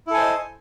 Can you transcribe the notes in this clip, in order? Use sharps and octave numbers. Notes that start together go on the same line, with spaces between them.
E4 A4 C5 D#5 G#5